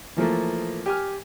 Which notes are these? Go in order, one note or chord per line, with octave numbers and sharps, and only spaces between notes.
E3 F3 A3 A#3
G4 G#5 F6